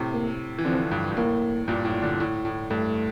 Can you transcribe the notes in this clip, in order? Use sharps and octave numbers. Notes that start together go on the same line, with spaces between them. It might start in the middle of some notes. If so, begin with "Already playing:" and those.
Already playing: A2 C3
A#3
E3
D3 F3 C4
G2
G2
A2 A#3
G2 A#2
A2
A#2 D3
A2
A2
G2 A3